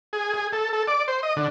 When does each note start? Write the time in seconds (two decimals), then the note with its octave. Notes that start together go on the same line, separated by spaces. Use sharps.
0.13 G#4
0.34 G#4
0.53 A4
0.73 A4
0.88 D5
1.08 C5
1.23 D#5
1.36 D3